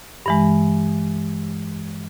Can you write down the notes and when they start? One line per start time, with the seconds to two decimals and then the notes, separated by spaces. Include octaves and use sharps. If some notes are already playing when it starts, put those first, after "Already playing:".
0.26 G2 E3 G#3